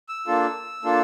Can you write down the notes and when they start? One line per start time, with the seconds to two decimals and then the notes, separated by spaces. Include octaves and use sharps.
0.09 E6
0.27 A#3 D4 F4 A4
0.83 A#3 D4 F4 A4